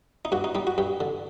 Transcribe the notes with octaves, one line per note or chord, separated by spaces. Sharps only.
D#4
G2 F#4
D#4
G3 D#4
F#4
G2 G4
D3